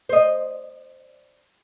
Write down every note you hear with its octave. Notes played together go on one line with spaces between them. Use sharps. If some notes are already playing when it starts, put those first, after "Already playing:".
C5 D#5